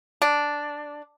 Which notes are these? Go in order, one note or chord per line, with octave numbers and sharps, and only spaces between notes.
D4